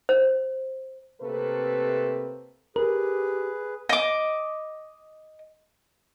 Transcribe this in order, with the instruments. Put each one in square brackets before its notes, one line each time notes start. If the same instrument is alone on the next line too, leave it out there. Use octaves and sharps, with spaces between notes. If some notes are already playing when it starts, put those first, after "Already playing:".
[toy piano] C5
[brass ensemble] C3 A3 A#3 C4 A4 B4
[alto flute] G4 [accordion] G#4 B4 [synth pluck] A#4
[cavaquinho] D#5 D6